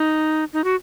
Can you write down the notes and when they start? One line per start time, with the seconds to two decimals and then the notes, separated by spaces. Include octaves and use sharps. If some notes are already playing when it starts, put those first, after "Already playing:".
Already playing: D#4
0.53 D#4
0.64 F#4